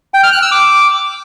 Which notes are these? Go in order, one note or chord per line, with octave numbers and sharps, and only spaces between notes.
G5
F6
F#6
E6
D6